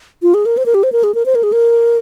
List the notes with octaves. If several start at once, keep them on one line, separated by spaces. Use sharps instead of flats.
F4
G#4
A#4
C5
A#4
G4
C5
A#4
G#4
A#4
C5
A#4
G#4
A#4